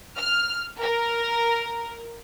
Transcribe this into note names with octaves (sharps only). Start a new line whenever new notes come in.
F6
A#4